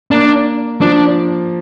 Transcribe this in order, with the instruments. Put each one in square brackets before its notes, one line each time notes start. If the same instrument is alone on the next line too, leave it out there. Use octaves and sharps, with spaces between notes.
[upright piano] A#3 [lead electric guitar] D4
[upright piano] F3 [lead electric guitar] D4